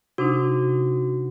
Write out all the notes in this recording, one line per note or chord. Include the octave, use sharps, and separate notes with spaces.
C3 D4 D#4 F#4